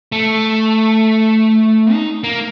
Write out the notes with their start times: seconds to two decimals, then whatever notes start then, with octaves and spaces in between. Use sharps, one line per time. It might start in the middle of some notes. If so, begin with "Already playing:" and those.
0.12 A3
1.93 D#4
2.24 A#3